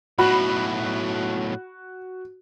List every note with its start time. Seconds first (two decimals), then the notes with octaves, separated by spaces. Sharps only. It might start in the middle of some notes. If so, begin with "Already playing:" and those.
0.19 B1 A2 F#4 B5